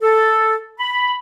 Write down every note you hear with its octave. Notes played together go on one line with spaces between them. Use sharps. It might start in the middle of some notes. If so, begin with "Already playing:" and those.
A4
B5